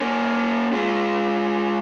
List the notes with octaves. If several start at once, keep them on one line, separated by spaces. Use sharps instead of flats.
A#3 C#4
G#3 F4